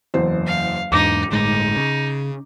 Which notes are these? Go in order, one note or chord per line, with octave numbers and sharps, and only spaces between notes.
F#1 E2 C5
F5
E2 G#2 D4 D#4 D6
G1 A2 G#3 D#4
C#3